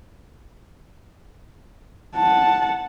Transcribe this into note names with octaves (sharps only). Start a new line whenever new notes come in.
F#5 A5